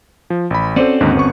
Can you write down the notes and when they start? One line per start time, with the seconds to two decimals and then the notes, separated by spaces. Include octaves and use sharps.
0.30 F3
0.50 A1 B5
0.76 C4 C#4 F#4 A4 C5 D5
1.01 D#2 G#2 D3
1.15 G1 B3 C#6